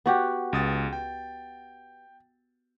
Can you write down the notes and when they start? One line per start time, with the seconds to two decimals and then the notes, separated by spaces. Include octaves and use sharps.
0.06 B3 F#4 G4
0.53 C#2 D#6 A6
0.93 G5